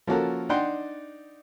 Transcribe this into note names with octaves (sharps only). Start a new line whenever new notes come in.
F3 A#3 C#4 F#4 A4 A#4
D4 D#4 D5 F#5 G5 C6